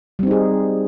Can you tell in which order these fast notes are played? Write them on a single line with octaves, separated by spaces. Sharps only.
G3 C4 D#4 G#4